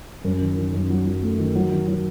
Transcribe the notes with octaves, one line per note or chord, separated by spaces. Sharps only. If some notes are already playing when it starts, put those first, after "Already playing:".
F#2
D#3
D#3
F#2
F#3
F#3
A3
D#3
F#3
D#3
F#3